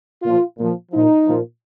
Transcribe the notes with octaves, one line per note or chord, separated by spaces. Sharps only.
A#2 F3 F4
A#2 F3
A#2 F3 D#4
A#2 F3